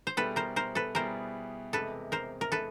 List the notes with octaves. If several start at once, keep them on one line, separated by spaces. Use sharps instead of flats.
C5
B2 G3 B3 E4 G#4 A4 B4
A#4 C5
A#4 C5
A4 B4
B2 G3 B3 E4 G#4 A#4 C5
E2 C3 E3 G#3 A4 B4
A#4 C5
A#4
C3 E3 G#3 A4 B4